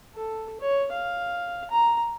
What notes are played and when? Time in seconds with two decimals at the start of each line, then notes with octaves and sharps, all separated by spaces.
0.14 A4
0.60 C#5
0.91 F5
1.71 A#5